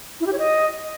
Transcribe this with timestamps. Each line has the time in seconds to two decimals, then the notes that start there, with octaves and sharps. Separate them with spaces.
0.21 E4
0.27 G4
0.33 C#5
0.39 D#5